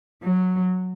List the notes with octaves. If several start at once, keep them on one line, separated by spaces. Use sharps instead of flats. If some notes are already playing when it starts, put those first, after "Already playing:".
F#3